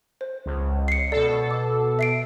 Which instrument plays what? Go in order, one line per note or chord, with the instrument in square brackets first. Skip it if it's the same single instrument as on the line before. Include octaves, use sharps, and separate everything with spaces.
[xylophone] C5
[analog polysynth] C#2
[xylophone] C7 C#7
[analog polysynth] B2 A4 [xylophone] D5
[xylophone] D6
E5 C7 D7